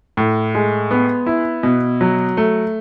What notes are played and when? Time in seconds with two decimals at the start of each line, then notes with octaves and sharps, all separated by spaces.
0.17 A2
0.55 G#3
0.91 B3
1.26 E4
1.63 B2
2.01 F#3
2.37 A3